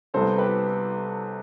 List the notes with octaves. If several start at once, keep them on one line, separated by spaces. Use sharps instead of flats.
C2 C3 E3 B3 A4 C5
G4 B4